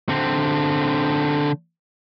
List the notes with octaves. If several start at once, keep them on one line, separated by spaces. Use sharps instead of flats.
D3 C4